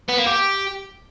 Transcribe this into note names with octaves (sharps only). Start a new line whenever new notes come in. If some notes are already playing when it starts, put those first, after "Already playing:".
B3
A#3
G4